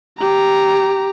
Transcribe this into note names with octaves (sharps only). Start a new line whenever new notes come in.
G4 A#5